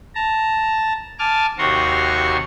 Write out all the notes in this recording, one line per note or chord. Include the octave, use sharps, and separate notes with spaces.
A5 A#5
G#5 A5 D6 F6
D#2 C3 F#4 A#5 C6 C#6